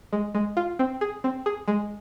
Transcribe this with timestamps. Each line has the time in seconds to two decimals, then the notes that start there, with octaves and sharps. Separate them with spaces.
0.13 G#3
0.35 G#3
0.57 F4
0.79 C4
1.01 G#4
1.24 C4
1.46 G#4
1.68 G#3